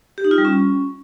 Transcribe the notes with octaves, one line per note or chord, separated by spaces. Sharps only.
G4
D#4
F4
G3
C#4